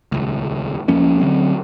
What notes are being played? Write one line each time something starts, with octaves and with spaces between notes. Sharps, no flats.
D#1 C#2
D#2 F3 A#3 C#4
D3 F#3 C4